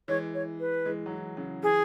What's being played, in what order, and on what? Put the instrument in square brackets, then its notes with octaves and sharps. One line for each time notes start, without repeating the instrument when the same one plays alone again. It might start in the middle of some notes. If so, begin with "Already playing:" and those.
[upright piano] E3 G#3 [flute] C#5
[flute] C#5
B4
[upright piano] E3 G#3
F#3
E3
C#3 F#3
[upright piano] E3 [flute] G#4